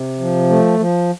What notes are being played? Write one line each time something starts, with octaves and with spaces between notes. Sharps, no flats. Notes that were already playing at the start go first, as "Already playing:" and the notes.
Already playing: C3
F3
A3
F3